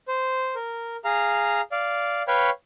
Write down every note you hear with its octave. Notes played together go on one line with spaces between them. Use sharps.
C5
A#4
G#4 F5 A#5
D5 F5
B4 C#5 F5 G5 B5 C#6